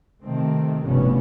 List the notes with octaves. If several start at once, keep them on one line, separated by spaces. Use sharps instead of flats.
C3 D#3 A3 C4
F1 A#1 G2 B2 B3 C#4